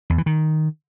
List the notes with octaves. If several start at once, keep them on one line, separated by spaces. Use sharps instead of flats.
E2
E3
D#3